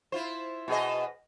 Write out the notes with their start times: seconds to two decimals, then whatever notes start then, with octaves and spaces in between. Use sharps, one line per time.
0.12 E4 F4 C5
0.68 B2 G#4 D#5